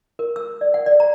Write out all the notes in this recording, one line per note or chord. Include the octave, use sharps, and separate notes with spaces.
A#4
E6
D5
F#5
D5
A#5